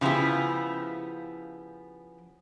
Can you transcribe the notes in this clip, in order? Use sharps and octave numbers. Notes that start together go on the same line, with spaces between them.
C#3 F3 B3 E4 G4